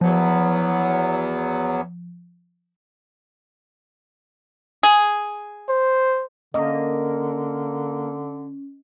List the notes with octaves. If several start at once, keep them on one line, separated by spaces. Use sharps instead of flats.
E2 F3 F#3 B3
G#4
C5
D3 A#3 C#4 D#5